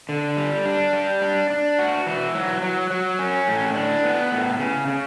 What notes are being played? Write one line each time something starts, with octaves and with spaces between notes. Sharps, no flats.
D3
G3
D4
G3
D4
D4
F#4
E3
F#3
F#3
F#3
C#4
A2
D4
B3
A2
C#3
C#3